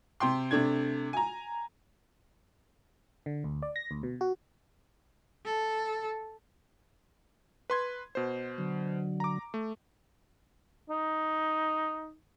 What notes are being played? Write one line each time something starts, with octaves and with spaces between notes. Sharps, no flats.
C3 G5 C6
C3 A3 D4 G#6
G#5 A#5
D3
D2
D5
A#6
D2
B2
F#4
A4
B4 C6 G#6
B2 C5
D3 F#3
A#5 D6
A3
D#4